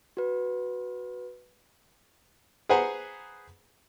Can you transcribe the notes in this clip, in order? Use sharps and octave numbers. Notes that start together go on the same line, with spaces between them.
F#4 B4
G#4 B4 C5 F#5 G#5 A#5